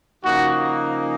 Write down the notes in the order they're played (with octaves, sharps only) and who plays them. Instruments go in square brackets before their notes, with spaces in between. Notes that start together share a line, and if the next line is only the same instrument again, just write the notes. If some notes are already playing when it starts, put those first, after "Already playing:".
[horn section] C#3 F3 A#3 D#4 F#4